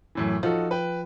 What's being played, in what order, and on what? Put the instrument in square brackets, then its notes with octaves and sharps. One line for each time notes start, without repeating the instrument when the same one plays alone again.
[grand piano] F#2 A2 E3
[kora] F3 [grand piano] D#4 F#4 A4
[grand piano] B4 G5